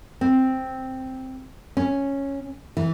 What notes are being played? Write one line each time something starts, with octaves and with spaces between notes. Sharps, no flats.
C4
C#4
E3